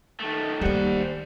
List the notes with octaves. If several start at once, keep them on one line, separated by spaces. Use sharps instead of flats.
D#3 A3
D#3 G3 A#3 C5 F#5